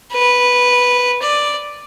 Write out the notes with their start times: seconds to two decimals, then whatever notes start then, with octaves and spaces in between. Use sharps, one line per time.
0.13 B4
1.22 D5